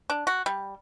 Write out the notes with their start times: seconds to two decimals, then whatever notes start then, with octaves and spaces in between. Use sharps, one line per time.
0.10 D4
0.27 F#4
0.46 G3